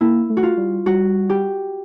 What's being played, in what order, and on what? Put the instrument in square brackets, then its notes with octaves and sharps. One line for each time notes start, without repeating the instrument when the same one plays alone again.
[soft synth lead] A#3 [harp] E4
[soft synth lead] A3
[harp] F#4
F4
[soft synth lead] G3
[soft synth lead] G3 [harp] F#4
[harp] G4